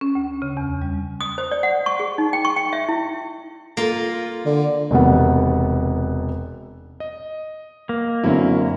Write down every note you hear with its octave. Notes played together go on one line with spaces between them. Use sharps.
C#4
D2
C#3
E2
G3
D#6
C5
D5
F#5
C#6
G#4
D#4
G5
C#6
G5
E5
E4
A#3 F4
D3
E1 C3 D#3 B3 F#5
D#5
A#3
F#2 D3 C4 C#4 E4